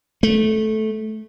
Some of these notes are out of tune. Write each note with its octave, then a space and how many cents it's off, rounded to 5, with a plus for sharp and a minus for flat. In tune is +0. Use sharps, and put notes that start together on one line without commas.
A3 -15